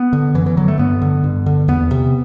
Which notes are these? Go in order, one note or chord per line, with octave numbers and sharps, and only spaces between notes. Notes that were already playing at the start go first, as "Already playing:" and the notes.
Already playing: B3
D3
F#2 E3
E3
D3 F#3
A3
G2 B3
D3
G2
D3
E2 B3
C3